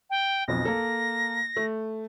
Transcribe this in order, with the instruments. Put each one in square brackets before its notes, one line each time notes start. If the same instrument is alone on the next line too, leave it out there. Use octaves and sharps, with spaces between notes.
[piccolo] G5
[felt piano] B1 F2 [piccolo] A#6
[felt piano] A#3 A4
A3